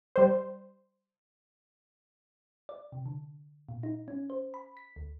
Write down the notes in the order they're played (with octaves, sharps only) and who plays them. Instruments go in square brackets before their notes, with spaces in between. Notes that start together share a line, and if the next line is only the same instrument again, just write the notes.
[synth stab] G3 C5
[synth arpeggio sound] D5
C3
D3
A#2
D#4
C#4
C5
B5
B6
D2